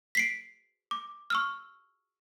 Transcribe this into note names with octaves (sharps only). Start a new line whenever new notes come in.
B6 C7 D7
D6
C#6 E6 F6